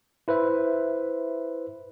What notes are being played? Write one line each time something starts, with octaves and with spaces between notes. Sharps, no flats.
E4 B4 C5 E5